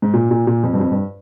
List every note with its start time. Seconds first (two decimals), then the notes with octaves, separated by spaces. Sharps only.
0.02 G#2
0.14 A#2
0.31 A#2
0.47 A#2
0.63 F2
0.73 G2
0.80 F2
0.91 G2